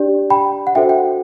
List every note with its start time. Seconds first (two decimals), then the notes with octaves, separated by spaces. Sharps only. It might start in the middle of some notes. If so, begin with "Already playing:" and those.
Already playing: D4 G4 D5
0.30 G5 B5
0.67 F#5
0.75 D4 F#4 A4 C5 E5 G5
0.89 G5
0.98 F#5